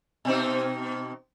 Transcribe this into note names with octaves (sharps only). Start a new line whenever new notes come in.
B2 C4 D#4